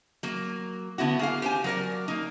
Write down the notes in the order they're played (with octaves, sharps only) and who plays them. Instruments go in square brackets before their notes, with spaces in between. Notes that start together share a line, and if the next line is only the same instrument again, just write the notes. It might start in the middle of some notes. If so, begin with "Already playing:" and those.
[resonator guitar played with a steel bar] F#3 A#3
D3 B3 E4 F#4
A#3 G#4 F5
G4 C5 G#5
F#3 A#4 D5
A#3 D#4